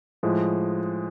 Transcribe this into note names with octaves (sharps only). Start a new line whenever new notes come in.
A2 F3 G#3